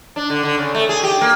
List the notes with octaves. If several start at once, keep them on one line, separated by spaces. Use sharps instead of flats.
D4
D3
D3
C#3
A3
G#4
G4
A#3